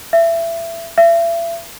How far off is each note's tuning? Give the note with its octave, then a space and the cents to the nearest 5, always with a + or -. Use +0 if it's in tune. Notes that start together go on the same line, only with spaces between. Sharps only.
E5 +20
E5 +35